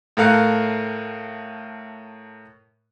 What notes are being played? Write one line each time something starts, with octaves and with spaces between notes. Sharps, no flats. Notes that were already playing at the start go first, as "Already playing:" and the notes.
A2 A3 A#4 F5 F#6 C#7